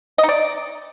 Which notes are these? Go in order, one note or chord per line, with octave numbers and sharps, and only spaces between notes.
D#5
D#4
D5